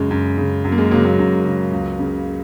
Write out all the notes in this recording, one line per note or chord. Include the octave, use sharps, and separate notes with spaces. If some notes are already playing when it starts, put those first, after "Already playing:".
Already playing: F#2 C#3 G#3
F#2
C#3
F#2 F#3
A#3
G#3
C#3 F#3 A#3
F#3 A#3
F#2
C#3
C#2
C#3